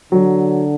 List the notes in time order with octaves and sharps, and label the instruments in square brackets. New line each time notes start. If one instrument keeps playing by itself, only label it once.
[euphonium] D3 [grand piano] F#3